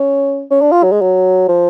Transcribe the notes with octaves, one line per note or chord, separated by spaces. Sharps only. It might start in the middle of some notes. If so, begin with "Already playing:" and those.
Already playing: C#4
C#4
D4
F4
F#3
G#3
F#3
F3